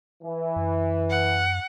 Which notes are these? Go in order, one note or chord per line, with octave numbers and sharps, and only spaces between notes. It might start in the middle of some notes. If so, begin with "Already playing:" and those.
E3
F#2
F#5